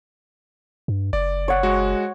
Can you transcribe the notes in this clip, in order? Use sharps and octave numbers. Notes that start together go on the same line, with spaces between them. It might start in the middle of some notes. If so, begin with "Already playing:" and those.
G2
F#1 D5
C#5 F#5
G#3 F#4